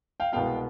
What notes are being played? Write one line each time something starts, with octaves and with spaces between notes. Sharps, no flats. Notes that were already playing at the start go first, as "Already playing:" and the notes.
F5 G5
C2 B2 G#3 B3 F5 G5